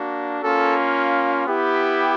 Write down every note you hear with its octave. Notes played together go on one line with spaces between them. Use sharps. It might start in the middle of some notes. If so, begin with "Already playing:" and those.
Already playing: A#3 D4 F#4
A#3 C#4 F4 A4
B3 E4 G4